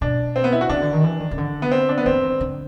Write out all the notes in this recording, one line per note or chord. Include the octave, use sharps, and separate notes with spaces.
B2 D4
C4
B3
E4
F#4
C#3 D4
D3
D#3
E3
D#3
C#3
D3
B3
C4
D4
B3
E3 C4
D#3
D3